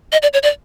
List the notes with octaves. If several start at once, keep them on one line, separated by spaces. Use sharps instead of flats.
D#5
D5
C#5
D5